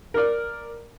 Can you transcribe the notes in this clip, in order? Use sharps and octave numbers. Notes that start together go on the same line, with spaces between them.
A#4 D5